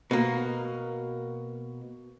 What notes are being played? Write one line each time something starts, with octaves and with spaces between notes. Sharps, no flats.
B2 A#3